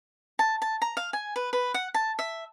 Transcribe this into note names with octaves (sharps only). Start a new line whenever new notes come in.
A5
A5
A#5
F5
G#5
B4
B4
F#5
A5
E5